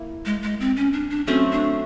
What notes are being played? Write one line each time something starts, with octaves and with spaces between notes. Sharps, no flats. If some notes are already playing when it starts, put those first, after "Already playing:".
Already playing: A#3 E4
G#3
G#3
C4
C#4
D4
D4
F#3 A3 C4 C#4
D4